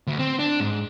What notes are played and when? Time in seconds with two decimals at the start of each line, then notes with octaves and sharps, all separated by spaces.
0.07 D2
0.19 C4
0.39 D4
0.60 G#2